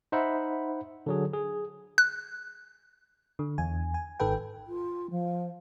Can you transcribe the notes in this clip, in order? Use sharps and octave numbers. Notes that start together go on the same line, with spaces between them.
D#4 C5 E5 F#5 B5
D3 F#3 G#4
G#4
F#6
D3
E2 G#5
G#5
G#1 D#3 A4 B4 G5
F4
F3